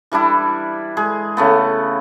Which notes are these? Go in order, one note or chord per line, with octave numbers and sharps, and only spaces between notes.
E3 G3 D4 E4
G#3 G#4
C#3 A3 B3